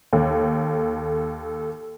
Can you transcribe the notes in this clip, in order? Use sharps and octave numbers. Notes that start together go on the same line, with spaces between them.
D#2 A4